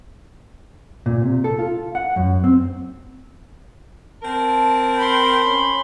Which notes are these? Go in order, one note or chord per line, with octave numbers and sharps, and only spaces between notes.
A#2
C3
A4
F4
F#5
F#2
C4
C4 A#4 A5
B5 C6
C#4